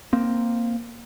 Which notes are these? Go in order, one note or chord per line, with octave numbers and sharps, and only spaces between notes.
A#3 C4